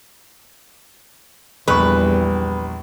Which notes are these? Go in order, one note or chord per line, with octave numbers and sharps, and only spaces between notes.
A#1 E2 G3 B4 C#6